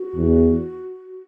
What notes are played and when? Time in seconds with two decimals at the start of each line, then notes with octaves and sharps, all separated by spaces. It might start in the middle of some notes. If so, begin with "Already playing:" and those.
Already playing: F#4
0.16 E2